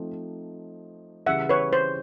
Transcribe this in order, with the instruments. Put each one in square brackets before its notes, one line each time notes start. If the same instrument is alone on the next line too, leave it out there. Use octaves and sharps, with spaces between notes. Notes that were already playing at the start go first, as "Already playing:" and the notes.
Already playing: [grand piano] F3 A3 C4 D#4
[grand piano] C#3 E3 G3 [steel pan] E5 F#5
[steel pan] B4 C#5
C5